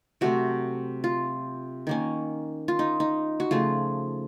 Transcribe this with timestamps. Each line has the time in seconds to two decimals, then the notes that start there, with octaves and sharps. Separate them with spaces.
0.21 C3 F#3 A3 C4 F#4
1.04 F4
1.87 D#3 A#3 C#4
2.68 F4
2.79 D#4
3.00 D#4
3.40 F#4
3.51 C#3 F3 A3 F4